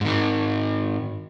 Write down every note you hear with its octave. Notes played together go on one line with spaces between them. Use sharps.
G#2 D#3